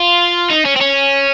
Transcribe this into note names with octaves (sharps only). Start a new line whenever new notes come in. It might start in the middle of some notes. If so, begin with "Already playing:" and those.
Already playing: F4
D#4
C#4
C4
C#4